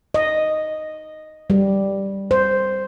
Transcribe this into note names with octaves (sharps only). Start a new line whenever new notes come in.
D#5
G3
C5